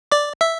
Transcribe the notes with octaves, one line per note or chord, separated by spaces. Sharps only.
D5 D6
E5 E6